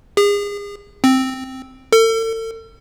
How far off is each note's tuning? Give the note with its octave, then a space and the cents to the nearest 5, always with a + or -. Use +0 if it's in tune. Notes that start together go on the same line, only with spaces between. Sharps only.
G#4 -35
C4 +0
A4 +40